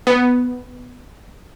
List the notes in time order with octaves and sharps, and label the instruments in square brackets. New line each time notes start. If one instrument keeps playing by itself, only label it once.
[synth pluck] B3